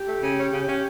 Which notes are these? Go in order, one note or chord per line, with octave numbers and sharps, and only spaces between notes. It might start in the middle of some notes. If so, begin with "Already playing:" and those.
Already playing: G4
A3
C#3
C#4
C#3
C#4